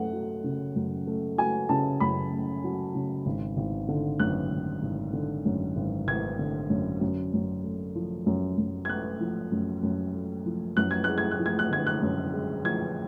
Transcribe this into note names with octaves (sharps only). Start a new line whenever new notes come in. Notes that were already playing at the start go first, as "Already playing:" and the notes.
Already playing: F#2 A3 F#5
F#3
C#3
F#2
A3
F#3 G#5
C#3 A5
F#2 B5
A3
F#3
C#3
G#1
G#1
D3
F#2 F#6
G#1
G#1
D3
F#2
G#1
G#1 G#6
D3
F#2
F#2
F#2
A3
F3
F#2
F#2
G#6
A3 F#6
F3
F#2
F#2
A3
F3
F#2 F#6
G#6
G#3 F#6
G#6
F#6
F3
G#6
F#6
D3 G#6
F#6
F#2
G#3
F3 G#6